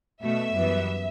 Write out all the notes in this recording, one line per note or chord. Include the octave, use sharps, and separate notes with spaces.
B2 A3 E5
F#2 E3 G3 B3